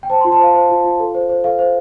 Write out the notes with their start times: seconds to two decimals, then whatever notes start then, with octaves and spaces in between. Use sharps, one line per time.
0.03 G5
0.10 C5 A5
0.21 F4 C6
0.32 A5
0.39 C5 F5
0.55 C5
0.70 F4
0.84 F4
0.99 A4
1.15 C5
1.29 C5
1.44 A4 F5
1.59 C5